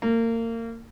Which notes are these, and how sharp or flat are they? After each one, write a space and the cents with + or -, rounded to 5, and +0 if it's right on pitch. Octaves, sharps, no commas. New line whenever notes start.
A#3 -30